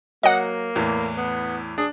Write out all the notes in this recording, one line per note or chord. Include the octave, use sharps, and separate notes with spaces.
F#3 A#3 D#5 F#5
E2 A2 E3
B3
D4 G#4